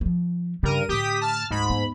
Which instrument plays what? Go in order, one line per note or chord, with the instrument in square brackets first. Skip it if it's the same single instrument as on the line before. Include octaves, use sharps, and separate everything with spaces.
[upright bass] F3 F#3
[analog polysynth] G2 A#4 D#7 [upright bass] C#3
[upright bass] A2 D3 [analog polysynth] G4 D#6 B6
[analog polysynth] A5 F6
[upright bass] D2 [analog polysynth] G#2 B5
[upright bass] D#2 B3